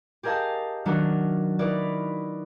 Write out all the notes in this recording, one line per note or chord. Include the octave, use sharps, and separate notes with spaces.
G4 G#4 A#4 D#5 F5 A5
D#3 F#3 A3 D4 F#4 A#4
D#4 E4 A#4 B4 D5